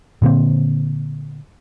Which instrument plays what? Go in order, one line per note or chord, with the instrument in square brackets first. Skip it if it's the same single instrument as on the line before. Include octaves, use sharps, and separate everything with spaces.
[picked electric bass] A#2 D3 A#3 C4